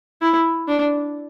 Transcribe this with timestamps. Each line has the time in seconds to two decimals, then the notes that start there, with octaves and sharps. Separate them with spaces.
0.22 E4
0.68 D4